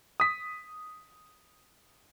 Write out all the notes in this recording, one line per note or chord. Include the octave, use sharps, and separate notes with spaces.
D#6 B6